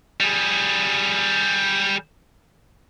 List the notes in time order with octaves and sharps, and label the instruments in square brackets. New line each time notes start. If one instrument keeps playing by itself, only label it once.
[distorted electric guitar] G3 G#4